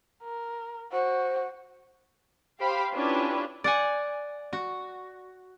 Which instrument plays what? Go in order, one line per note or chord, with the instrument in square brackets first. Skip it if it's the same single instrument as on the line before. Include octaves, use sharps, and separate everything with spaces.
[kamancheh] A#4
[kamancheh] F#4 [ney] C5
[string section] G4 C5 F5 G5 B5
C#4 D4 E4 F4 G4 B4
[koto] D5 F#5 G#5
F#4